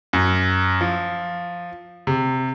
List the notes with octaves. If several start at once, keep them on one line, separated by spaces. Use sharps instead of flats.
F#2
F3
C3